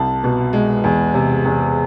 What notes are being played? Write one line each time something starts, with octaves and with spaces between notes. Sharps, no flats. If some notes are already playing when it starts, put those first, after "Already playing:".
Already playing: C2 A5
B2
G#3
E2
C3
E2